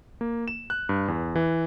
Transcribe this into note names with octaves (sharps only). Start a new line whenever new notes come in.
A#3
E7
F#6
G2
E2
E3